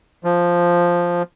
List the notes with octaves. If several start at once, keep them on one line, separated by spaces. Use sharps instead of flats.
F3